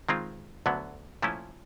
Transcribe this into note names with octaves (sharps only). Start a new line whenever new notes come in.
D#3 G#3 C4 F4
D2 D3 F#3 B3
A#2 F3 A3 C#4 E4